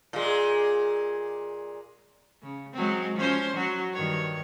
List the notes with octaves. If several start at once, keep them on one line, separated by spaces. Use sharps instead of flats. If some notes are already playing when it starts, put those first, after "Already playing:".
A#2 G#3
C#3
F#3 G#3 C4
F3 C#4 C5
F#3 F#4
G2 D#3 C#5